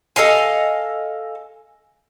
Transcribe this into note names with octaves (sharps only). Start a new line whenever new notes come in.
A4 D#5 F5 G#5